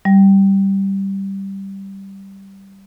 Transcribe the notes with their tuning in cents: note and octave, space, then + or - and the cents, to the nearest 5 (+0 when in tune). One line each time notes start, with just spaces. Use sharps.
G3 -5